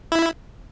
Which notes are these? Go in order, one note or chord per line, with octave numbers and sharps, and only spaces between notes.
E4